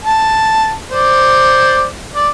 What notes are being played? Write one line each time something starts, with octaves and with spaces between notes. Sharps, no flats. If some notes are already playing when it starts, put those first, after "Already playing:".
A5
C5 D5
D5